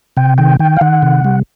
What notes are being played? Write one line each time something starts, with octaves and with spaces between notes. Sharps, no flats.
C3 G5
D#3 G5
D#3 G5
F5
D#3 F#5
C3
G3